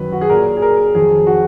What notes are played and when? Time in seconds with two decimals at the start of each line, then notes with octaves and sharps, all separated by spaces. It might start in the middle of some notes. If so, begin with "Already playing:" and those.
Already playing: F#2 D#3 F#3 B4
0.12 F#4
0.21 G#4
0.29 A#2 F#3 A#4
0.57 G#4
0.62 A#4
0.95 F2 D#3 F#3 G#4
1.27 F#4